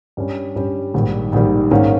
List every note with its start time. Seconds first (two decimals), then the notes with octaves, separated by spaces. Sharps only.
0.17 G2 G3 C#4
0.56 G2 G3 C#4
0.94 A#1 G#2 D#3 G3
1.32 A#1 G#2 D#3 G3
1.71 G#1 G#2 D#3 A#3 C#4